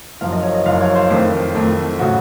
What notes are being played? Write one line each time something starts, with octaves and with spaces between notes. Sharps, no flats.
F#1 F#2 F3 F5
D#5
C#5
D#5
F#1 F#2 F3 F5
C#5
C5
F2 D#3 A3 C5
F2 D#3 A3
C#3 A3 F#4